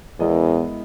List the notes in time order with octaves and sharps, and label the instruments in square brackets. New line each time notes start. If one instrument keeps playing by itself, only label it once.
[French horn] E2 [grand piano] G#3 B3 E4 A#4 D#5